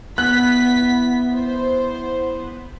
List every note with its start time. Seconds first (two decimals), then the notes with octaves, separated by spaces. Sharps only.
0.18 B3 E4 F#6 B6
1.33 C5